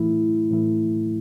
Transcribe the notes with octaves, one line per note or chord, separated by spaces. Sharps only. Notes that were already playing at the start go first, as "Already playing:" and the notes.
Already playing: A2 E3 A3 E4
A2 E3 A3 E4